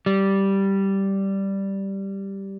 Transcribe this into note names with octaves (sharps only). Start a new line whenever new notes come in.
G3